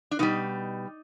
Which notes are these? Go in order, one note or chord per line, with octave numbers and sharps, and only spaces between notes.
D4
B2 G3 D#4